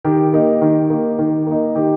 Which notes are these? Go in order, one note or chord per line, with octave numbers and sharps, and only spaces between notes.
D#3 G4
A#3 D#4
D#3
A#3 D#4
D#3
A#3 D#4
D#3 G4